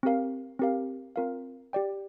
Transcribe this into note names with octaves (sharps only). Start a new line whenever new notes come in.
C4 G4 A#4 F5
C4 G4 A#4 F5
C4 F4 A#4 F5
G4 D5 G5